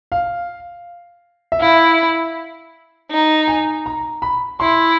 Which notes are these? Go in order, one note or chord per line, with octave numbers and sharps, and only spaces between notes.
F5
E5
E4 F5
D#4
G#5
A#5
B5
E4 C6